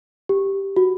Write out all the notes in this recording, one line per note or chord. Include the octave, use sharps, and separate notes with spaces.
G4
F#4